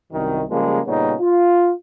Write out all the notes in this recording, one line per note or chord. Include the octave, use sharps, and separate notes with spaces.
C2 F#2 C3 D#3
C#3 F3 G3 G#3 A#3
A#2 C#3 G3 B3 C#4 D#4
F4